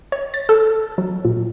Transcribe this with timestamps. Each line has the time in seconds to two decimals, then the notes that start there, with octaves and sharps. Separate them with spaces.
0.12 C#5
0.34 A6
0.49 A4
0.98 F#3
1.25 A#2